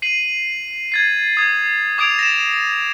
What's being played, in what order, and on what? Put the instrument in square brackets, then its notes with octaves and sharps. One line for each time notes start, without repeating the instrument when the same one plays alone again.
[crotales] C7 D#7 F#7
G#6 A6 C7
D#6 G#6
D6 D#6 G#6 D7 F7
A#6 E7